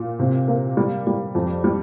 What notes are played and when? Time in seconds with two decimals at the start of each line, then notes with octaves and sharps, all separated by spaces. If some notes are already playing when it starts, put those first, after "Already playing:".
Already playing: A#2
0.19 C3
0.48 A#3
0.77 G3
1.07 G3
1.35 F2
1.64 G3